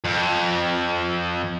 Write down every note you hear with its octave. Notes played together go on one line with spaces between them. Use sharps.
F2